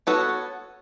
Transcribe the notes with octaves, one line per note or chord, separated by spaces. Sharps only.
B3 F#4 A4 C#5